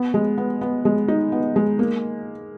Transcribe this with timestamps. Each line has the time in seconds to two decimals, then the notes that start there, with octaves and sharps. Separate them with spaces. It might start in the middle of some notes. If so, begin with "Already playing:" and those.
Already playing: B3
0.14 G#3
0.38 B3
0.61 B3
0.85 G#3
1.08 D#4
1.32 B3
1.56 G#3
1.79 A#3